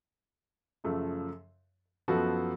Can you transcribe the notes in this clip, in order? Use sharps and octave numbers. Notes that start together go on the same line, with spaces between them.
F#2 C#3 F3 A3
F#2 F3 B3 F#4 A4